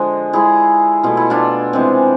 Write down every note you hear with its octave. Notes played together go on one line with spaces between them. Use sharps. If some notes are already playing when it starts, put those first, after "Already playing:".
Already playing: D3 F3 G#3
D3 G#3 E4 G#4
B2 A3 F4
E4
D4 F4
C3 E3 G#3